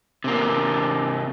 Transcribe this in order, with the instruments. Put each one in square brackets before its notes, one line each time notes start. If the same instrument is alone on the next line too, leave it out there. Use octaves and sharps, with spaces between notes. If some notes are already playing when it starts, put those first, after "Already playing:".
[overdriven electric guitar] C3 A#3